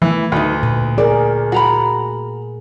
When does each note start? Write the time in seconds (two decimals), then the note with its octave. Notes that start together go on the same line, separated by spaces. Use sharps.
0.02 E3 A3
0.32 D2 D#4 B4
0.63 A#2 B4
0.98 G#4 A#4 D5
1.52 F#4 A#5 B5